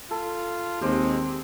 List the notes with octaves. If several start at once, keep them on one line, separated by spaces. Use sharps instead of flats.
F4 A4
D#2 G#3 C4 G4 C5